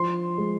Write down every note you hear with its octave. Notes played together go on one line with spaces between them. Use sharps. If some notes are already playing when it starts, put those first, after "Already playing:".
Already playing: F3 C6
G#3